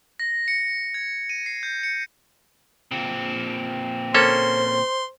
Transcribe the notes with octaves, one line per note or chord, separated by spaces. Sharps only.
A#6
C#7
G#6
D#7
C7
G6
C#7
A#2 C4
A#3 C#4 A4 C5 C6